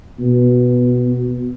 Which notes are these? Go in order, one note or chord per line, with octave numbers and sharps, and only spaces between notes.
B2